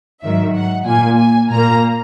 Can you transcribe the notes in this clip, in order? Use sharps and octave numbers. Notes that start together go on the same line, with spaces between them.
G#2 D#3 F#3 E5
F#5
A#2 A#3 G#5
G#5
A#2 A#3 A#5